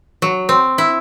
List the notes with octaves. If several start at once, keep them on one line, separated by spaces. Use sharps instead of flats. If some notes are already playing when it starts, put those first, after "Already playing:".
F#3
C4
E4